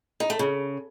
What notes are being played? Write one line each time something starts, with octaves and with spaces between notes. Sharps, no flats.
D#4
A3
C#3